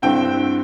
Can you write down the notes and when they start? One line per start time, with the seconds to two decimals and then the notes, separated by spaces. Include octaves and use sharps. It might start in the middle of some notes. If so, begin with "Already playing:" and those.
0.02 G2 D3 C4 E4 G5